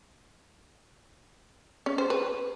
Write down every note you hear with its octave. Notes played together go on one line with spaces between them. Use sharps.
C#4
C5
B4